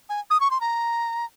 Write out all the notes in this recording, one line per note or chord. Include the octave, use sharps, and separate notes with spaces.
G#5
D#6
C#6
C6
A#5